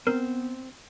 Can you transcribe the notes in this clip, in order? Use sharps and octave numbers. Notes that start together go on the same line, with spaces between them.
B3 C4 A#4